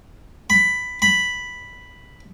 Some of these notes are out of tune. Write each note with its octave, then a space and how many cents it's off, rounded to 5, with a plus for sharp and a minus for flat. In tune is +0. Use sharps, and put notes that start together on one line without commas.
B5 +10
B5 +0